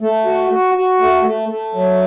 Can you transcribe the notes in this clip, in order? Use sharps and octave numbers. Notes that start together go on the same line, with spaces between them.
A3
F#4
F#4
F#4
A3
A3
A3
F#3